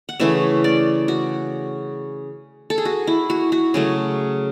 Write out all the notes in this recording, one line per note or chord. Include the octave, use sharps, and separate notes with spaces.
F#5
C#3 E3 A3 C#4 E5
D5
F#4
A4
G#4
F#4
E4
F#4
F#4
C#3 F#3 A3 G#4